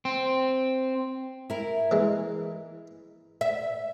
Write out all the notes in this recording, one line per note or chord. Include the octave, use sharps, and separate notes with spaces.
C4
E4 A#4
E3 G#3
E5